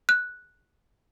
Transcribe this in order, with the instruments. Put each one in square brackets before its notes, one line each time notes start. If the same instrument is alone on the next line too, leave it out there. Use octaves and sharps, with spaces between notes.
[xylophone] F#6